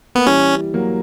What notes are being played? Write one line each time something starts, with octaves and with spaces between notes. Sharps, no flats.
A#3 B3
E3 G3 C#4
F#3 A#3